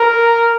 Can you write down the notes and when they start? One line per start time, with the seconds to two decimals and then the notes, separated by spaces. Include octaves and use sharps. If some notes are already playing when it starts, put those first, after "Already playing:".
Already playing: A#4